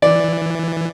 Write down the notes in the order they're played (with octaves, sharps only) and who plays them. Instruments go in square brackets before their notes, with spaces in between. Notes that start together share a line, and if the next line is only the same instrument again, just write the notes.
[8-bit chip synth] E3 [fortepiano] D5